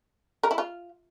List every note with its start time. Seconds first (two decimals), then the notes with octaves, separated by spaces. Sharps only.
0.43 A#4
0.51 E4
0.58 F4